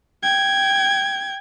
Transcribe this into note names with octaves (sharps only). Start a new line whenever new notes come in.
G5 G#6